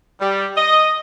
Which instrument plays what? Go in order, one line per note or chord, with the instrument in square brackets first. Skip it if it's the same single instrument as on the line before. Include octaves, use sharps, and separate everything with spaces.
[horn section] G3
D#5